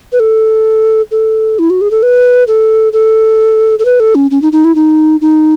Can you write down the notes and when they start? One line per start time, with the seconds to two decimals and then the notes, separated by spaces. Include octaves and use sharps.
0.12 B4
0.20 A4
1.11 A4
1.59 E4
1.70 F#4
1.81 G#4
1.91 A4
2.03 B4
2.48 A4
2.93 A4
3.79 A4
3.85 B4
4.00 A4
4.15 C#4
4.31 C#4
4.42 D#4
4.52 D#4
4.64 E4
4.75 D#4
5.21 D#4